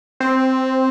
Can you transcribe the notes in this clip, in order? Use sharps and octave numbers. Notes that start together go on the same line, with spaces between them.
C4